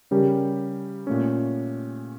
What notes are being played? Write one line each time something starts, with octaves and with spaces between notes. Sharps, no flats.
C#3 G3 C#4 G4 A#4
A#2 A3 C#4